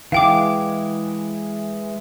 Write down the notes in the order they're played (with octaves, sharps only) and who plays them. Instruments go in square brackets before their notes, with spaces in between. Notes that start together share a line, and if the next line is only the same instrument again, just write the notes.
[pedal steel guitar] E3 G#3 [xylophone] F5 G5 D6